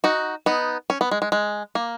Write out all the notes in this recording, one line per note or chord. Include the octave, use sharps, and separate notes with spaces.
D#4 F#4
B3 D#4
C#4
B3
G#3
G#3
G#3
A#3